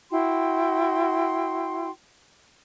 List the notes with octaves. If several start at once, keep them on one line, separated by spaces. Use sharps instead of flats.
E4 F#4 G5 C6